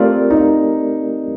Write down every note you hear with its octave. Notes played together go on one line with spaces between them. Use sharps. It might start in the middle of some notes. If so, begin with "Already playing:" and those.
Already playing: A3 C4 F4 G4 A#4 D5
D#4